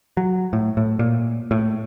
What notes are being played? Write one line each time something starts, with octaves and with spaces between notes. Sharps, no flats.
F#3
A2
A2
A#2
A2